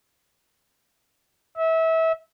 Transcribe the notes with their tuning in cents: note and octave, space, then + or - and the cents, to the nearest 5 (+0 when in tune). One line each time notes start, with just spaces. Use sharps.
E5 -25